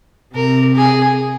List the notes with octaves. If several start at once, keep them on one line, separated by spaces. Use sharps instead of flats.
C3 A#4
G#4